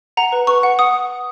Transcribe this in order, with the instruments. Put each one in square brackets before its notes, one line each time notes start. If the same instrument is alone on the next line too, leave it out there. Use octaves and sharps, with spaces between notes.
[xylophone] F#5 A#5
B4
B4 C#6
F#5
F#5 D#6